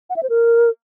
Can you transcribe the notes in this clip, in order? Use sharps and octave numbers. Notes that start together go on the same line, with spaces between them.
F#5
E5
C5
A#4